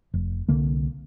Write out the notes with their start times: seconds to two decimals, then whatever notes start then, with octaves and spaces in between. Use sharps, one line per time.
0.14 F1
0.49 C2 D3 A#3